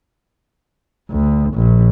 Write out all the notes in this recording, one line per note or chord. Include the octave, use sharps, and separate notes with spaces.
D2
A#1